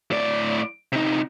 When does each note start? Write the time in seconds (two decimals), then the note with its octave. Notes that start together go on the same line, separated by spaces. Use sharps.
0.11 A2 D5
0.92 C3 D#4